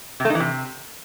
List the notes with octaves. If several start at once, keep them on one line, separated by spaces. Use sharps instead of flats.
C3
A3
D#4
E3
C3